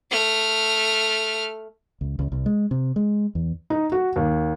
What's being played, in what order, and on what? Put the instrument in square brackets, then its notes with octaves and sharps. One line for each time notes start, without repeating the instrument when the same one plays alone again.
[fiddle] A3 F6
[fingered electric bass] C#2
C#2
C2
G#3
C3
G#3
E2
[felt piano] D#4
F#4
D#2